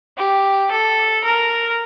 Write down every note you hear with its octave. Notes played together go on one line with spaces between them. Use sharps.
G4
A4
A#4